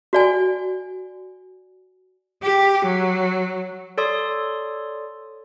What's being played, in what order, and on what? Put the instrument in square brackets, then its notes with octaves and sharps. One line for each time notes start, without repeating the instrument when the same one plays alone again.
[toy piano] F#4 D5 G#5
[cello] G4
F#3
[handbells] A4 C#5 D5 C6 D#6